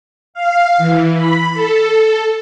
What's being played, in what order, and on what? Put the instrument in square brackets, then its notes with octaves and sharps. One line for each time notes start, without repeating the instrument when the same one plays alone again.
[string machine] F5
E3
B5
A4